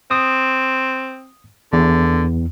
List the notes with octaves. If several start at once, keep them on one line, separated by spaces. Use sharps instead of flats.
C4 D#6
E2 D3